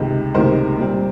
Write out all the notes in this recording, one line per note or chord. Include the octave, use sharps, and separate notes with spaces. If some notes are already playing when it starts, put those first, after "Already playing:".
Already playing: C#2 C3 D#3
C#2 C3 D#3 A#4 C5
A#2 G3 C4